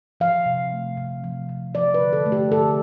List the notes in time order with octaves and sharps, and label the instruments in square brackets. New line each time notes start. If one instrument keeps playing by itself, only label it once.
[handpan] F3 F5
C3
A3
C3
F3
C3
F3 D5
B4
D3
A4
A3
G4
D3 A4